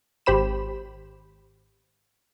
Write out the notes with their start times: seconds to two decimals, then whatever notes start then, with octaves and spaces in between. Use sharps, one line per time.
0.26 G#1 G4 C5 B5 E7